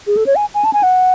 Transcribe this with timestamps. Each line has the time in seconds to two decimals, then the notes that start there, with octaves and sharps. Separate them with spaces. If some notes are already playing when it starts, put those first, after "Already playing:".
0.07 G#4
0.17 A4
0.26 C#5
0.36 G#5
0.54 G#5
0.65 A5
0.73 G#5
0.83 F#5